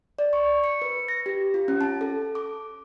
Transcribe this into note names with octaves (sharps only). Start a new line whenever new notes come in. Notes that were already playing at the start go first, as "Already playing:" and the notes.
D5
C#6
C#7
B4
A#6
G4
F4
C#4
A5
A4
D6